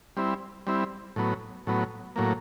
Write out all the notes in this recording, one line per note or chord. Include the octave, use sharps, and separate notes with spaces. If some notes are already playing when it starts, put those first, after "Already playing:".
G3 C4 E4
G3 C4 E4
A2 F#3 B3
A2 F#3 B3
A2 F#3 A#3